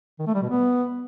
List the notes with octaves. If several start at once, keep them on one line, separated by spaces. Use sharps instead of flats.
D#3
A3
G3
B2
B3